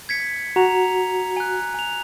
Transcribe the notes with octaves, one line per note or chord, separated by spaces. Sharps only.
G#6 B6 C#7
F#4 A#5 F7
G#5 F#6
G#5 F7